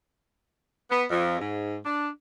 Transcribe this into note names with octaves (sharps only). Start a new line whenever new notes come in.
B3
F2
G#2
D4